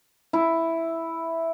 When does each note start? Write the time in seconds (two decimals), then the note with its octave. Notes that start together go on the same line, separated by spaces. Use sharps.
0.33 E4